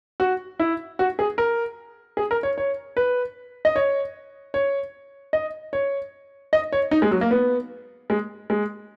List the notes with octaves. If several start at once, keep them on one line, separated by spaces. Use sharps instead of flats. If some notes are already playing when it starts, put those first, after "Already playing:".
F#4
E4
F#4
G#4
A#4
G#4
A#4
C#5
C#5
B4
D#5
C#5
C#5
D#5
C#5
D#5
C#5
D#4
G#3
F#3
A#3
B3
G#3
G#3